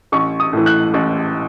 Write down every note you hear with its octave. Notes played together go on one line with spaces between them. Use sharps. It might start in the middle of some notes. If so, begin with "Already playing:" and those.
A1 C#6
D#6
A2 E3
F#6
A1